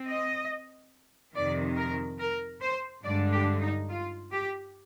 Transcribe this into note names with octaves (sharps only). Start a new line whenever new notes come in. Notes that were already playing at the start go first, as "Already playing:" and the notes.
Already playing: C4
D#5
F2 C3 D#3 D5
A#4
A#4
C5
G2 D3 G#3 D4 D5
G4
D#4
F4
G4